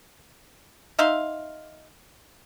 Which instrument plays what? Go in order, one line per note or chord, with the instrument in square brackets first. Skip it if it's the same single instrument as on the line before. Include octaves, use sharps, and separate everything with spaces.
[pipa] D#4 E5 F5 C6